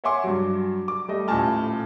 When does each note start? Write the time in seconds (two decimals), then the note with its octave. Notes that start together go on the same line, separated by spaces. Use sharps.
0.04 C#5 E5 F#5 G#5 C6 D6
0.24 G2 F#3
0.88 D6
1.08 G3 A3 D#5
1.28 D#1 A2 F4 G#5 A5 F6